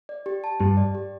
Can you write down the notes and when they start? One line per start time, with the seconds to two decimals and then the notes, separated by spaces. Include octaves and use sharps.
0.09 D5
0.26 G4
0.44 A5
0.60 G2 G4
0.77 D5
0.95 G4